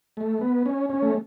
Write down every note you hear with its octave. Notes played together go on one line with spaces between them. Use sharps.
A3
B3
C#4
C#4
A3